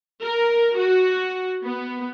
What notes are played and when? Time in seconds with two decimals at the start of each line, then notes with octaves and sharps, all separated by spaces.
0.24 A#4
0.78 F#4
1.65 B3